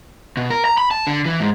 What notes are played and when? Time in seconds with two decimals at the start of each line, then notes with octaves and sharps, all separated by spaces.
0.37 B2
0.50 A#4
0.65 A#5
0.78 B5
0.91 A5
1.07 D3
1.25 E3
1.40 G#2